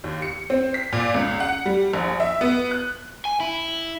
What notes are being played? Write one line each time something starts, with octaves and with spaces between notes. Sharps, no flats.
D#2
C#7
C4
B6
A#2
C#2
F#5
G3
A#1
E5
B3
F#6
G#5
E4